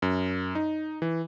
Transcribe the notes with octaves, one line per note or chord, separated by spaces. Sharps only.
F#2
D#4
E3